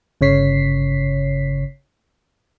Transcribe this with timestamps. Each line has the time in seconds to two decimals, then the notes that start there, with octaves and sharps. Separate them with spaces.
0.21 G1 C#3 C#5 B6 C7